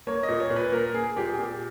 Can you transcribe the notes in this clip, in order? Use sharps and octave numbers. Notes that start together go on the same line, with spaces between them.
A#3 C#5
D#5
A#2
C#5
A#2
B4
A#3 A#4
A#3 G#4
A#2 G4
G#4
A#2 G4